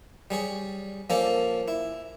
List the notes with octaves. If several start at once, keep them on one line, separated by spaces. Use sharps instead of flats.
G3 G#4 C#5
F3 A#3 C#4 A4 C#5 D5
E4